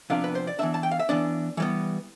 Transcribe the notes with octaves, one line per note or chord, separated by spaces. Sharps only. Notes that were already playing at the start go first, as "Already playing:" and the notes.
C3 F3 B3 D4 F5
B4
C5
D5
E3 B3 D4 E5
A5
G5
F5
E5
E3 B3 D4 D5
E3 G3 B3